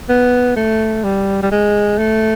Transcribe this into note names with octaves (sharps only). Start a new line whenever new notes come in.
B3
A3
G3
G3
G#3
A3